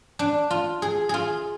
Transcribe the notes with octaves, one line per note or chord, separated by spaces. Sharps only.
D4
F4
G#4
F4 G#4